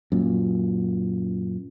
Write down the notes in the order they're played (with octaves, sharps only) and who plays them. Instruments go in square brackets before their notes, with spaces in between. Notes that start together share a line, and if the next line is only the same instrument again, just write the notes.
[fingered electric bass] F#2 A#2